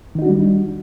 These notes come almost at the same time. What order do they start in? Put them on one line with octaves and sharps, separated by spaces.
D#3 D#4 F#4 D4 G3